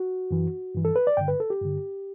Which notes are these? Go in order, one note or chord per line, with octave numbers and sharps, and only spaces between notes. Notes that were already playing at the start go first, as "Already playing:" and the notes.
Already playing: F#4
F#2 E3
G2 E3
A4
B4
D5
G2 D3 G5
B4
A4
G4
G2 D3